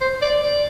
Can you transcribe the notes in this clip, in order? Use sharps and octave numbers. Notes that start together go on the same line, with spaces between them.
C5
D5
D5